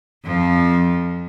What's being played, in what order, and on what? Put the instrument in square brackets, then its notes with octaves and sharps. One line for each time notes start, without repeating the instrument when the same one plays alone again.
[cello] F2 F3